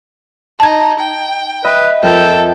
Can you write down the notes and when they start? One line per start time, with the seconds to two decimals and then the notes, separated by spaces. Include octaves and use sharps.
0.60 D#4 A5 G#6
0.99 G5
1.64 B4 D#5 E5 B5
2.03 F2 A4 A#4 G5 G6